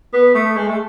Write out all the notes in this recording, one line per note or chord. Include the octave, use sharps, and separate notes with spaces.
B3
A3
G#3
A3